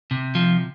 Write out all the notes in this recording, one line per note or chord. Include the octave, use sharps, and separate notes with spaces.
C3
F3